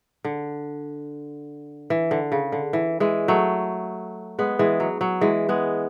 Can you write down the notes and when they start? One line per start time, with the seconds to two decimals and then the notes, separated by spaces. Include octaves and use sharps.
0.24 D3
1.90 E3
2.11 D3
2.32 C#3
2.52 D3
2.73 E3
3.00 E3 G#3
3.28 F#3 A3
4.39 G#3 B3
4.59 E3 G#3
4.80 F#3
5.01 F#3
5.21 E3 G#3
5.49 G#3 B3